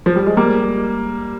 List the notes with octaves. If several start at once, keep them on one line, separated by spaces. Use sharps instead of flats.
F3
G3
G#3
G3 A#3